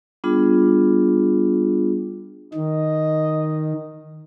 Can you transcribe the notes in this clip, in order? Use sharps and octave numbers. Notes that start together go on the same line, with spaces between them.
G3 B3 D4 F4 G#4
D#3 D#5